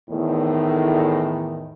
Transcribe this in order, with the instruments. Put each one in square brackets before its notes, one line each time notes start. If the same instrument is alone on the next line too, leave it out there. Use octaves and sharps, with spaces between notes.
[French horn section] E2 A2 D#3